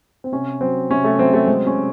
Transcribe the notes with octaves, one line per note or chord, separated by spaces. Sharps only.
C4
C3 C#4
F#3 C4
C3 C#4
A3
F#3 C4
A3
G#3 C4
C#4
C3